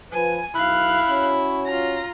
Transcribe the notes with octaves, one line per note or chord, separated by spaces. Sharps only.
F3 B4 G#5
B1 E4 F5 F#6
C#4 F#4 C#5
F4 A#5